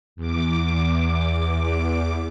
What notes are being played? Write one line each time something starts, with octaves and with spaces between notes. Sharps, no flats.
E2 D6